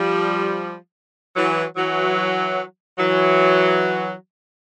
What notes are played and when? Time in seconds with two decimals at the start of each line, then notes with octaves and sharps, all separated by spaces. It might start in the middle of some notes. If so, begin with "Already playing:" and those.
Already playing: F3 G3
1.35 E3 F#3
1.76 E3 F#3
2.99 E3 F#3